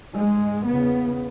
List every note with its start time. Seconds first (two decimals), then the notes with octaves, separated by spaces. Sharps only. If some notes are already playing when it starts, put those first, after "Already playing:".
0.15 G#2 G#3
0.67 E2 C#3 B3